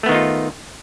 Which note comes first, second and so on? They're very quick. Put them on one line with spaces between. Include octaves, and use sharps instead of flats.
A3 B3 D#3 D#4 F4